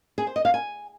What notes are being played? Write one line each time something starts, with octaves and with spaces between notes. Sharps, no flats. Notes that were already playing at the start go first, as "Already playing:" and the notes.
G#4
C5
D#5
F5
G#5